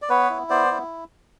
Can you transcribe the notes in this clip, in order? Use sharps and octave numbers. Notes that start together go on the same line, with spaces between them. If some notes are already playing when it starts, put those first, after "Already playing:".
D5
B3 B4 C#5
E4
B3 C5 D5
E4